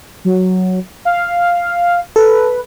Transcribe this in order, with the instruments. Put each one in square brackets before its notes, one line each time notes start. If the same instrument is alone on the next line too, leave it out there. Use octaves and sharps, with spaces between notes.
[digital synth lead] F#3
F5
[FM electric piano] A4 [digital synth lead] B4